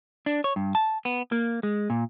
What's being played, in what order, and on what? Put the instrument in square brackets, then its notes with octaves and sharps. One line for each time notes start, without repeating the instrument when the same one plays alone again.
[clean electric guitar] D4
C#5
G2
A5
B3
A#3
G#3
A#2